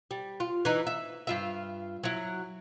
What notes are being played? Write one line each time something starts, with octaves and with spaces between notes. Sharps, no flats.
G3
F4
E3 D#4
E5
G2 F4 E5
F#3 E4